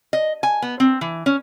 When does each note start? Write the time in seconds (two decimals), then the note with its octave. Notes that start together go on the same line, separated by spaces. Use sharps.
0.13 D#5
0.43 G#5
0.62 B3
0.80 C4
1.01 E3
1.26 C#4